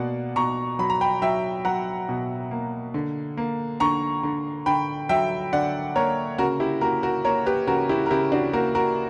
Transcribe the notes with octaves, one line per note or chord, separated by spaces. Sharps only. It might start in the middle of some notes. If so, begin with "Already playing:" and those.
Already playing: B2 A#3 D5 F#5
B2 A#5 C#6
F#3 B5
A#5
G5 B5
F#3 E5 G5
F#3 F#5 A#5
B2
A#3
D3
A#3
D3 A#5 C#6
D3
D3 G5 B5
F#3 E5 G5
D3 D5 F#5
A#3 A#4 C#5
C#3 F#4 A#4
E4 G4
A#3 F#4 A#4
F#4 A#4
A#3 A#4 C#5
G4 B4
C#3 F#4 A#4
E4 G4
A#4
C#3 E4 G4
D4 F#4
A#3 F#4 A#4
F#4 A#4